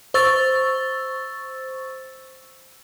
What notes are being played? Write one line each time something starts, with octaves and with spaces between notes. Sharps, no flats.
C5 C#6 E6 A6